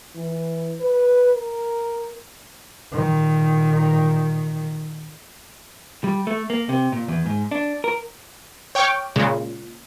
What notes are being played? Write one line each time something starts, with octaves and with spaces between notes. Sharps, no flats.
E3
B4
A#4
A#2 D#3
G3
A3
A#3
C3
A#2
E2
G#2
D4
A#4
C#5 G5 C#6 D6 F6
A#2 C#3 G#3